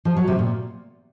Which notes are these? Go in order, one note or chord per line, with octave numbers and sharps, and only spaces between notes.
F3
F#3
C3
A#2